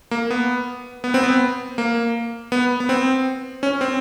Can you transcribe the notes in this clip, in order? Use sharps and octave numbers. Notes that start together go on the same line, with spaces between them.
A#3
B3
B3
C4
B3
A#3
B3
B3
C4
C#4
C4